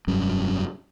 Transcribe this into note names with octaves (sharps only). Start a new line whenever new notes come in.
F1 G2 F#3 C#4